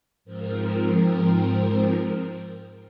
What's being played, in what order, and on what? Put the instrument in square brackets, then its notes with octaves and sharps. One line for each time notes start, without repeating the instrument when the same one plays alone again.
[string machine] G#2 F3 C4 A#4